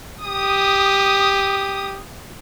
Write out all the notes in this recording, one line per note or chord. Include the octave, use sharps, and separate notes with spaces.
G4 D#6